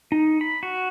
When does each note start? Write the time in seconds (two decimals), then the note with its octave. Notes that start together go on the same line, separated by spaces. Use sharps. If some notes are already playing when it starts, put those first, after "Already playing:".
0.12 D#4
0.41 B5
0.63 F#4